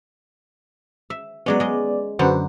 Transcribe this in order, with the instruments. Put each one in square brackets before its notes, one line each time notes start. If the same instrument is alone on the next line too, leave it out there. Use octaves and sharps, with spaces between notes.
[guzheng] E5
[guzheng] F#3 G#3 C#4 [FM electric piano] B3 D5
[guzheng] G#3 D#5
[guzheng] F#2 D3 [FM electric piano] F#4 B4 C5